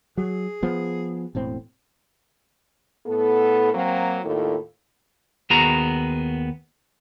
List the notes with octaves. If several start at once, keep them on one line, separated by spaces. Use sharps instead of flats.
F#3 G#4
F3 B3
E1 A2 C4
A2 B3 A4
F#3 A#3 C4
D#2 A2 D#3 E4 F4 A4
D#2 B3 F#4 G#4 A#5